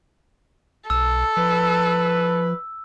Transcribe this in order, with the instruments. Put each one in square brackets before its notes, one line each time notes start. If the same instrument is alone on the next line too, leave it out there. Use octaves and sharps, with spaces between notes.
[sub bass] B1 [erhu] A4 [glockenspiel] E6
[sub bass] F3 [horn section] B4